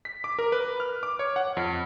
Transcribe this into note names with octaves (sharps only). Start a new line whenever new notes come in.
B6
D6
A#4
B4
F6
D6
C#5
F#5
F2